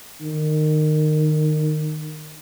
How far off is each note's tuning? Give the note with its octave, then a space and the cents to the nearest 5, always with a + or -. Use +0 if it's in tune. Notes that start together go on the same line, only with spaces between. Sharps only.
D#3 -20